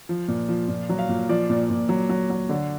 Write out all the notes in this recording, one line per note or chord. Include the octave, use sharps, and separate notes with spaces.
F3
A#2
F3
A#2
F#3
F5
A#2
F3 D5
A#2
A#2
F#3
F#3
F#3
D3